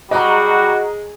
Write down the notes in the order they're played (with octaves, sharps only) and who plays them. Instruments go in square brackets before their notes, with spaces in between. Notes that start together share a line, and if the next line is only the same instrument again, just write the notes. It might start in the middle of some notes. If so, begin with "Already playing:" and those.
[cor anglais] G3 [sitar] G#3 [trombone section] F#4 [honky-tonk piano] D#5 A#5